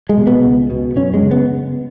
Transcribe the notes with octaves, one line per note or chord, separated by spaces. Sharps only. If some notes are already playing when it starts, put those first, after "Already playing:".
G#3
B2
B3
C#2
B2
F#2 C#4
G#3
C#3
B3